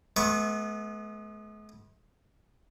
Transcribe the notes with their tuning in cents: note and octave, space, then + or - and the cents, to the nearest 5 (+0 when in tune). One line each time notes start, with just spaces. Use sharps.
G#3 +45 B3 -15 C#6 +0